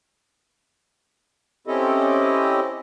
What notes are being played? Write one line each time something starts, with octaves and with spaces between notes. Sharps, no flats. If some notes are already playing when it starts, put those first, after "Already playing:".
C4 C#4 E4 G4 A4 D#5